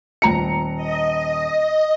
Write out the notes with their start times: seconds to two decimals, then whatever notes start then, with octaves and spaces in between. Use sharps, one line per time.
0.22 D#1 A#5 C#7
0.76 D#5